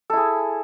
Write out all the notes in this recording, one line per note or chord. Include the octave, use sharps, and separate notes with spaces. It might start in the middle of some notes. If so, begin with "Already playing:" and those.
E4 G#4 A4